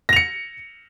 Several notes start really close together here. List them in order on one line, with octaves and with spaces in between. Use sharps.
A#6 F7 C#7